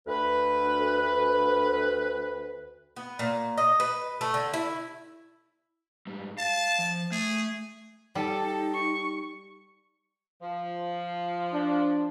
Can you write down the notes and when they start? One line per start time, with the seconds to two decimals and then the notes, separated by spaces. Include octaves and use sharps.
0.07 D2 B4
2.96 B3
3.19 A#2
3.58 D#5
3.80 B4
4.21 A3
4.34 D3
4.53 E4
6.07 G#2 G3
6.38 F5 A5
6.79 F3
7.12 A3 G#4
8.15 G3 D#4 A4
8.73 C#6
10.41 F3
11.53 D4